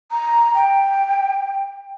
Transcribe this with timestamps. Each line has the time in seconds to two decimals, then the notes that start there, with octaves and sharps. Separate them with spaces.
0.11 A#5
0.55 G5